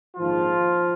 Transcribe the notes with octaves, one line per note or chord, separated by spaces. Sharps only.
A#1 G#2 D#3 F3 F4